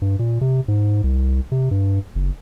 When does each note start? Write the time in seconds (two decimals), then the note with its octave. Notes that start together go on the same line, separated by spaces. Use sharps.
0.02 G2
0.19 A#2
0.41 C3
0.68 G#2
1.04 C2
1.52 C3
1.71 G2
2.15 F#1